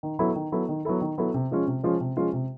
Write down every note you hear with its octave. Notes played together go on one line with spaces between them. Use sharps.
D#3
F#3 B3 E4 A4
D#3
F#3 B3 E4 A4
D#3
F#3 B3 E4 A4
D#3
F#3 B3 E4 A4
C3
F3 G#3 C#4 F4
C3
F3 G#3 C#4 F4
C3
F3 G#3 C#4 F4
C3